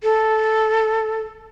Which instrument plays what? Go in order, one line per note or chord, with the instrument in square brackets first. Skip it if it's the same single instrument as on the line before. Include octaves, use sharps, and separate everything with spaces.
[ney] A4